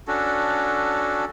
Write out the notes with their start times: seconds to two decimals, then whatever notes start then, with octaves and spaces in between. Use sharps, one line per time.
0.08 C#4 D4 F#4 A4